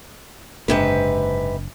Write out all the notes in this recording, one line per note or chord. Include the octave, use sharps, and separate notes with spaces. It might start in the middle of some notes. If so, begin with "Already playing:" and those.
F#1 G#2 C3 D4 B4